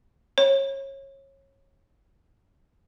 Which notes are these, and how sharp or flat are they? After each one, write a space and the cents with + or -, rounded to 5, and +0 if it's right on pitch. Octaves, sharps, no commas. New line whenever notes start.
C#5 -25